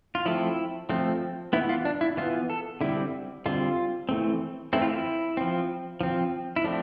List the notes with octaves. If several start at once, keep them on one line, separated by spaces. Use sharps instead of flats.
F4
F3 A3 C4 E4
F3 A3 C4
E3 B3 E4
F4
D4
E4
E3 B3 F4
A4
D3 G3 C4 E4
D3 G3 C4 F4
E3 A3 C4
E3 A3 C4 E4
F4
E4
F3 C4
F3 C4
E4
F3 A3 C4 D4